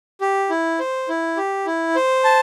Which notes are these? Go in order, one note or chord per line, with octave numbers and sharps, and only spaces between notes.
G4
E4
C5
E4
G4
E4
C5
A5